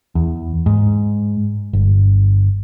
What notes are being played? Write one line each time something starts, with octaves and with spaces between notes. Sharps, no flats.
E2
G#2
G1